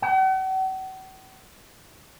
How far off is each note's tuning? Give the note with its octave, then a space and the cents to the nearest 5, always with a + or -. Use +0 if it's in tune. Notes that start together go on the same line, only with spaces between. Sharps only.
F#5 +45